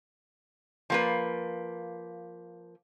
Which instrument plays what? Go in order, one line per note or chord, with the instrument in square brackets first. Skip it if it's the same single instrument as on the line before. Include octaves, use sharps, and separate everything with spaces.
[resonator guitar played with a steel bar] F3 A#3 B4